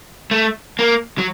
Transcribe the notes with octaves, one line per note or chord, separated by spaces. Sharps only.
A3
A#3
F#3